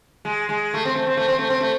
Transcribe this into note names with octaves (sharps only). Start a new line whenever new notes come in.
G#3
G#3
A3
C4
A3
C4
A3
C4
A3
C4
A3